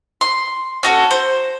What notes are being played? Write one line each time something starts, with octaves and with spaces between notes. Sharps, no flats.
C6
C#4 F#4 A4
C5